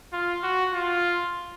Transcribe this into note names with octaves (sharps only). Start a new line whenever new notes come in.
F4
F#4
F4